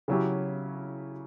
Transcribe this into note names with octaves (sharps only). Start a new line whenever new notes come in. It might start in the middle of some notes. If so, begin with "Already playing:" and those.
C#3 F#3 C#4 E4 G4